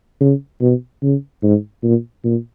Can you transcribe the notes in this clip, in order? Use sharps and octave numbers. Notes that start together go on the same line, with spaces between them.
C#3
B2
C#3
G#2
A#2
A#2